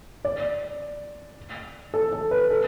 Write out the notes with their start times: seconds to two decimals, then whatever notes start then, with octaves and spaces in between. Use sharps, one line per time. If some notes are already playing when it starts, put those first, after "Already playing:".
0.25 D5
1.94 A4
2.12 A4
2.31 B4
2.50 A4